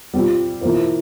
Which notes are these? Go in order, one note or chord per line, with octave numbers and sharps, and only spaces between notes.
G3 C4 F4
E3 A#3 F4 C5